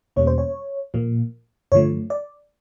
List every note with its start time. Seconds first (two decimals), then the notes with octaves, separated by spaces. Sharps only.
0.16 E2 B2 G3 A#3 C#4 C#5
0.27 C5
0.38 C#5
0.94 A#2 F3 A#3
1.72 G2 D3 F3 A3 C#5
2.10 D5